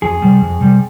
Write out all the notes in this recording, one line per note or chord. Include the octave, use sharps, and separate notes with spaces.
F2 G#4
C3 G3
F2
C3 G3